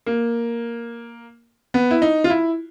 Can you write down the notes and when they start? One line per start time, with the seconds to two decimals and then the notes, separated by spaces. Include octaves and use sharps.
0.06 A#3
1.74 B3
1.91 E4
2.02 D#4
2.24 F4
2.30 E4